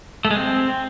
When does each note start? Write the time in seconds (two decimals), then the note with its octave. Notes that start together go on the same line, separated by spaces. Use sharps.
0.25 A3
0.31 G#3
0.37 C4